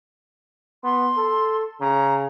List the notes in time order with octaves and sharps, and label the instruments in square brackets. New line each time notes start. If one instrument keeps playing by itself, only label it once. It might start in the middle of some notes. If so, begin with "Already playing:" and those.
[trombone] B3 [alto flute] C6
[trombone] A4
[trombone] C#3 [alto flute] A#5